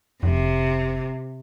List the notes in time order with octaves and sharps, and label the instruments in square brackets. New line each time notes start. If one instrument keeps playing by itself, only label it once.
[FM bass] F1 [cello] C3